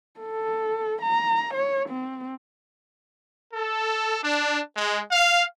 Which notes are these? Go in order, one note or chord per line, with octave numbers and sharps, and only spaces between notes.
A4
A#5
C#5
C4
A4
D4
G#3
F5